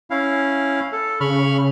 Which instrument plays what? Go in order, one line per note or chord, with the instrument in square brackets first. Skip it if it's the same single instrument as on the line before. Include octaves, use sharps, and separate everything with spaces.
[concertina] C#4 E4 F5
A4
[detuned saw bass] C#3 [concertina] B5 C#6 F6